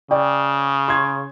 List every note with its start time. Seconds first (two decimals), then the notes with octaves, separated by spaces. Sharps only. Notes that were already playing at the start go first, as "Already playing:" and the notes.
0.11 C#3 D5 G5
0.88 C6 G#6